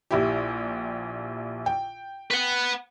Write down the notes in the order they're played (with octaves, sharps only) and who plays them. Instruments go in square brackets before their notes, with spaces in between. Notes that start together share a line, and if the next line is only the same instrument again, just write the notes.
[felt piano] A#1 E4 G4
G5
[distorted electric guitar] B4 F#5